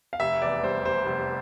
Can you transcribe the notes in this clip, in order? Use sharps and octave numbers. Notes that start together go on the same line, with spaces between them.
F5
F1 E5
E2 D5
G3 C5
F1 C5
F1